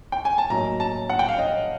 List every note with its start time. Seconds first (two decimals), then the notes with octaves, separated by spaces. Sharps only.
0.12 G5
0.25 G#5
0.38 A5
0.50 A2 F#3 A#3 D#4 A#5
0.80 A5
1.10 F#5
1.19 G5
1.29 F5
1.39 D#5